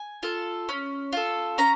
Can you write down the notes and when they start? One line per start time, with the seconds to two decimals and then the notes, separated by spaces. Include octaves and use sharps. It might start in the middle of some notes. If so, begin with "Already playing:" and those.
Already playing: G#5
0.23 F4 A4
0.69 C#4
1.13 F4 A4
1.58 C#4 A#5